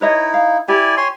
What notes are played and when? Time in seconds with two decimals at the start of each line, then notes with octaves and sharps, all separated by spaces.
0.01 D#4 E4 B4 C#5 D#5
0.34 F5
0.68 E4 G4 D5 G#5
0.97 C#5 G#5 C6